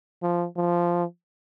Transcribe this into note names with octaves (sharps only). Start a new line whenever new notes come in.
F3
F3